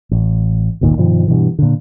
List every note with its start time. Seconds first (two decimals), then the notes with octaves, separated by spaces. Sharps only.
0.11 A1
0.81 G1 D2 A#2 D#3
0.97 G2 B2 D#3 F3
1.28 G2 B2 E3
1.59 A#2 D3